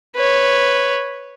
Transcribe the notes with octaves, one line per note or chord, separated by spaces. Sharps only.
B4 C#5